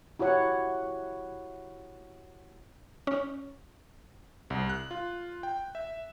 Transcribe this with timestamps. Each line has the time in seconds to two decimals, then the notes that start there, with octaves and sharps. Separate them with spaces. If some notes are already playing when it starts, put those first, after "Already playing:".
0.19 E4 F#4 G4 C#5 F#5
3.07 C#4
4.50 C2
4.69 F#6
4.91 F4
5.43 G5
5.75 E5